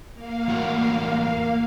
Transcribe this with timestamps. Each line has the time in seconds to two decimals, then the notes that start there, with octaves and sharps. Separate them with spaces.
0.13 A#3 F5
0.48 E2 A2 F#4